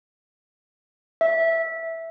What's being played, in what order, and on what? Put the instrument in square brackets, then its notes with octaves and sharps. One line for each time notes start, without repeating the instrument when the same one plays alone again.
[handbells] E5